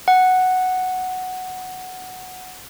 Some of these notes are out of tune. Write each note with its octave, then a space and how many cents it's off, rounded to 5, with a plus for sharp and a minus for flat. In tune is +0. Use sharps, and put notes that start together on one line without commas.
F#5 +0